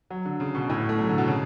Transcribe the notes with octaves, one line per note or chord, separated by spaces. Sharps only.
F#3
D3
C#3
B2
A2
B2
A3
F#3
D3
B2
C#3